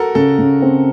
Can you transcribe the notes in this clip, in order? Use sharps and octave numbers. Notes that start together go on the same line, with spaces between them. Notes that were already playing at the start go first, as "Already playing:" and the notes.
Already playing: F#4 A4 A#4
C#3 A4
C#3
C4